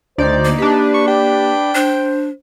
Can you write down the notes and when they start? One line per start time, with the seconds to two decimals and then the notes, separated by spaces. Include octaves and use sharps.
0.18 D2 D#4 C5 D5
0.45 A#3
0.58 D4 G4 B4
0.94 C#6
1.07 G4 G5
1.75 D4 C5